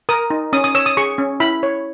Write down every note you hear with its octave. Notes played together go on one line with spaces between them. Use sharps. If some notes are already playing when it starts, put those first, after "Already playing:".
A#4 D#6
D#4
C#4 D#6
D#6
C#5 E6
D#6
G#4 C#6
C#4
E4 B5
C#5